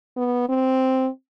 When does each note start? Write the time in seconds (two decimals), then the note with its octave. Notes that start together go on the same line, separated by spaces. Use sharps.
0.17 B3
0.49 C4